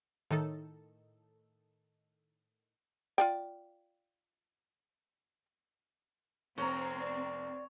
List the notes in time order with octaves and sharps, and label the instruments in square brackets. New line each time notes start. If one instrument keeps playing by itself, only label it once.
[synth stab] A2 D#3 D#4 A4
[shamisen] F4 D5 G5
[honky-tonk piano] F1 A#5 [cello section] C4 [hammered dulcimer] C#5
[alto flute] D5